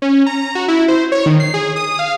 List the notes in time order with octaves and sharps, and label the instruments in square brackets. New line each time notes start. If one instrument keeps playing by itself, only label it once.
[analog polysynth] C#4
A#5
A#5
F#4
E4
C5
C#5
D#3
C7
G#4
D#6
F5